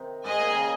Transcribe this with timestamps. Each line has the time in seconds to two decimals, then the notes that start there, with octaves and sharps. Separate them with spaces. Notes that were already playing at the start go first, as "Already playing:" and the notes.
Already playing: C3 D#3
0.24 G#2 G#4 D#5 G#5
0.40 A#2
0.50 D#3
0.55 C#3